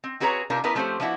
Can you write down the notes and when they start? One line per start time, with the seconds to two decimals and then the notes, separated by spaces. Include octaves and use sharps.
0.04 C4
0.20 C4 F#4 G#4 B4 C#5 A#5
0.50 C3 D4 F4 A#4
0.64 B3 D4 E4 A#4 B4
0.75 F3 A3 C4 C#4 G4 C5
1.00 F3 B3 D4 E4 F#4